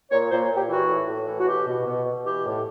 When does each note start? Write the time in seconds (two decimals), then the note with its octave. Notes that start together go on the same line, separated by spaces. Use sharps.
0.11 A#2 C#5
0.30 A#2 C5
0.50 A#2
0.56 G4
0.69 E3 F#4
0.89 A2
1.08 A2
1.27 E3
1.39 F#4
1.47 B2 G4
1.67 B2
1.86 B2
2.05 B2
2.25 E3 G4
2.45 A2